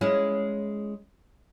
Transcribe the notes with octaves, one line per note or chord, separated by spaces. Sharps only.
G#3 C#4 E4